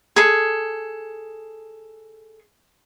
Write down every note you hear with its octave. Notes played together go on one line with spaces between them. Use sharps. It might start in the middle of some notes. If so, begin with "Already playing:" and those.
G#4 A4